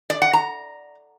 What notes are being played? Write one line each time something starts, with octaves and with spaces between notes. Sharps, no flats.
D5
F#5
A#5